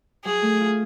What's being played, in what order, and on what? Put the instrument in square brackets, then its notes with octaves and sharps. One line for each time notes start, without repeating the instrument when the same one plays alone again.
[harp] F#3 [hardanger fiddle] G#4
[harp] A3
F4